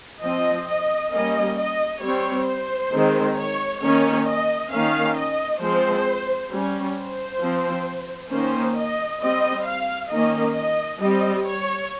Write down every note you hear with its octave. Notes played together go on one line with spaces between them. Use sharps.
F3 C4 D#5
D#5
G3 A#3 C#4 D#5
D#5
G3 C4 C#5
C5
D#3 G#3 C4
C#5
D#3 A#3 C#4 C#5
D#5
D#3 A#3 C#4 F5
D#5
F3 G#3 C4 C5
G3 C#4
C5
F3 C4
D#3 A#3 C#4 C5
D#5
G3 C4 D#5
F5
D#3 A#3 C#4 D#5
D#5
G3 C4 D#5
C#5